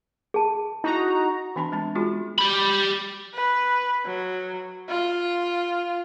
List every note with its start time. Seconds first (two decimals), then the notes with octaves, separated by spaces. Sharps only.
0.34 G#4 A5
0.84 D#4 E4 F#4 A#5
1.56 E3 B3 D4 A5 B5 C6
1.72 G#3 C4 A5
1.95 G#3 B3 D#4 F4 F#4 G#4
2.38 G4 B5
3.34 B4
4.06 F#3
4.89 F4